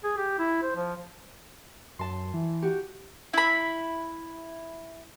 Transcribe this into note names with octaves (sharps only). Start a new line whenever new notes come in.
G#4
G4
E4
C5
F3
F#2 A5 C6
E3
F#4 G4
E4 B5